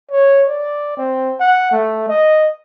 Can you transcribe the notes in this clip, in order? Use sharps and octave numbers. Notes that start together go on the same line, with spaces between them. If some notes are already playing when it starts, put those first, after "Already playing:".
C#5
D5
C4
F#5
A3
D#5